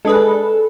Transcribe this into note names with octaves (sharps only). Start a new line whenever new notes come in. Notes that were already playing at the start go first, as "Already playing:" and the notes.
G#3 D4 G#4 A4 B4